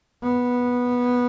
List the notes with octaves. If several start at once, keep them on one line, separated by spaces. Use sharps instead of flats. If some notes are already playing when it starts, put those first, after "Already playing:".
B3